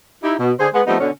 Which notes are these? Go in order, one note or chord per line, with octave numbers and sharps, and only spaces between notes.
D#4 E4 G4
B2
D3 G#4 C5
G#3 B3
F3 G3 A3 B3 C4 D#4
B2 D3 C#4